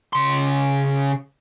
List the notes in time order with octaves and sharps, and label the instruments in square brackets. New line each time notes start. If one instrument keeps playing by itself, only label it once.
[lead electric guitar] C#3 C6